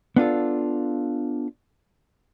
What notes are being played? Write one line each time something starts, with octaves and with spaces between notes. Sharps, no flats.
B3 D4 F4 A4